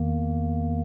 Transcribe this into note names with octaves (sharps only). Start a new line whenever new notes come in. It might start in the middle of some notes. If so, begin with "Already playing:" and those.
Already playing: E2 D#3 A#3